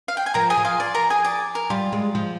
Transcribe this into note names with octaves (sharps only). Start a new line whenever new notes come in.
F5
G5
G#5
F3 A#4 A#5
G#4 G#5
F3
F4 F5
D5
A#4 A#5
G#4 G#5
D5
A#4
G3 F4
G#3
F3